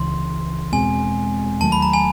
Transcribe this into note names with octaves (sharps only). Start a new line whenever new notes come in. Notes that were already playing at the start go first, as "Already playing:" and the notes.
Already playing: C#2 C#3 E3 C6
E2 B2 G#3 C4 G#5
D#2 D#3 F#3 A3 A5
B5
A#5
G#5